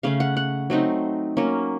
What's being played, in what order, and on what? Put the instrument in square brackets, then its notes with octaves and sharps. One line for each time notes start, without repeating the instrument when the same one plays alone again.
[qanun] C#3 A3 C#4 F5
F#5
F#5
F#3 A3 C4 D#4
F#3 A#3 C#4